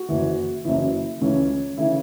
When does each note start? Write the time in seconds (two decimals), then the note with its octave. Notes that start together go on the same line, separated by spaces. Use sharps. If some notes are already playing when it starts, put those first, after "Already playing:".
Already playing: F#4
0.09 F#1 F#2 E3
0.65 F#1 F#2 E3 E4
1.21 C#2 C#3 E3 A3 C#4
1.77 C#3 E3 A3 E4